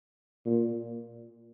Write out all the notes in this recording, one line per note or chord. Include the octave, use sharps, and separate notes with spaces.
A#2